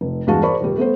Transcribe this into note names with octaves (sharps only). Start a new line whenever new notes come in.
F1
E2 G2 G#3 F#4 F5 A5
G#4 A#4 C5 D5 B5 C#6
D#1 G3
A3 B3 A4 C5